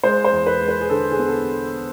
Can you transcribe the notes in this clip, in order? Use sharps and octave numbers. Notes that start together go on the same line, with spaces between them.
G#3 C5
C5
E2
B4
G#3
B4
G#4
D3 A4
G#4
B3
A4